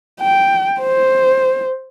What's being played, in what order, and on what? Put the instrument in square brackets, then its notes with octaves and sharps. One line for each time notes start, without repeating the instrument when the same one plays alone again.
[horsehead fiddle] G5
C5